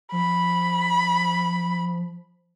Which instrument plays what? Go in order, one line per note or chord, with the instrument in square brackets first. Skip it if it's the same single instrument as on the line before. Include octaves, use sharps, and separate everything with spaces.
[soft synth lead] F3 [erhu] B5